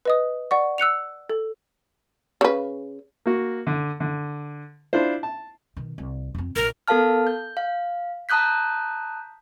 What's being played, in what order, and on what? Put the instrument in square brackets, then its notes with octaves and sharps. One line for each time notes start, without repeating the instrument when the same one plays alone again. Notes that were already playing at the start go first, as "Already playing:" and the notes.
[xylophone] B4 D#5 D#6
D5 F#5 C#6
E6 F#6 C#7 F7
A4
[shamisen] C#3 B4
[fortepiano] A#3 F#4
D3
D3
D4 E4 F4 C5
A5
[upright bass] B2 D#3
C2
F2 C4
[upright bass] A#1 [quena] A#4
[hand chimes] B3 A4 A#4 F5 A5 F6
G6
F5
A5 A#5 D#6 F#6 G6 B6